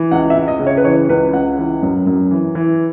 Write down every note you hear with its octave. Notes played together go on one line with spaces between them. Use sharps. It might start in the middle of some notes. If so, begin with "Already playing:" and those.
Already playing: E3
C#2 F#5
E5
C#2
D#5
C#3
C#5
B4
E3 C#5
C#2 B4
C#2 F#5
E3
F#2
F#2
E3
E3